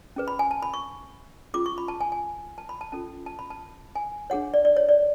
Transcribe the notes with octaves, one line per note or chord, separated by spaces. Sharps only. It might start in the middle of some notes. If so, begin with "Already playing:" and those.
C#4 G#4 B4
B5
G#5
A5
B5
C#6
C#4 F4 G#4 D6
C#6
B5
A5
G#5
G#5
A5
B5
A5
C#4 F4 A4 A5
A5
B5
A5
G#5
D4 G#4 C#5 F#5
D5
D5
C#5
D5